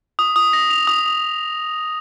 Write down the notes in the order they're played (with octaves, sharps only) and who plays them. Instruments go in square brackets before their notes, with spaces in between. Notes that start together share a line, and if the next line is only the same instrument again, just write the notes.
[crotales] D#6
D#6
A#6
F7
D#6
D#6